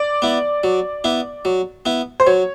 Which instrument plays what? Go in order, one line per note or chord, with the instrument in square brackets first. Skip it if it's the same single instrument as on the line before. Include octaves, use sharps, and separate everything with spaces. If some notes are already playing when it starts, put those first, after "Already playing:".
Already playing: [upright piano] D5
[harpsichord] B3 E4
F#3
B3 E4
F#3
B3 E4
[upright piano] C5
[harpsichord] F#3 [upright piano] C#5